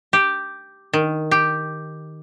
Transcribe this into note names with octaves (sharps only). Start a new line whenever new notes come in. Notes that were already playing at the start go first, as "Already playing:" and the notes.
G4
D#3
G4